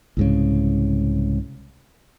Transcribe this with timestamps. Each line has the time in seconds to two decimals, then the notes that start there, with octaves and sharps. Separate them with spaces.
0.17 C2 G#2 C#3